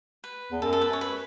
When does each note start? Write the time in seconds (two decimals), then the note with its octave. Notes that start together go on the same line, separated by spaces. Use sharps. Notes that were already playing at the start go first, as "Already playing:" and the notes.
0.24 B4
0.52 E2
0.62 F#2 A4
0.73 A4
0.81 B4
0.93 C#5
1.01 B4